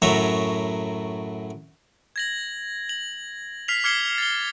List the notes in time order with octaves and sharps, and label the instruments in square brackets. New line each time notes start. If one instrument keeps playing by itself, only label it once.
[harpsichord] F#2 A2 F#3 C#5 E5 A#5
[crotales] G#6 A#6 F#7
F#7
F6 B6 C7 F7
D6 F6 G#6 C7 C#7 G7
A6 G7